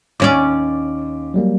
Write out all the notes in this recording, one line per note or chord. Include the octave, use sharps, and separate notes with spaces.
D#2 C#4 D5 D6
F#3 G3 A#3